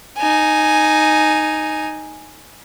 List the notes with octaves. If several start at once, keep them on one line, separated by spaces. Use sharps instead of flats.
D#4 G#5